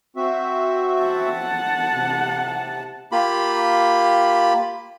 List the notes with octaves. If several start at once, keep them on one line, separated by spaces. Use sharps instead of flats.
C4 F#4 E5
F#5 A5
C3
A#3 F4 G4 B5